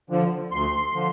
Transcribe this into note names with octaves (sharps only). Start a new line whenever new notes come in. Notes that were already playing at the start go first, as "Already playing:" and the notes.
D3 F3
D2 C6
D3 F3